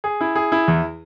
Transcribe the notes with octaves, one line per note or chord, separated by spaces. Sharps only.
G#4
E4
G#4
E4
E2